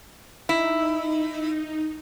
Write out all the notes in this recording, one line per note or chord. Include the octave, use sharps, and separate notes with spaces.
D#4 E4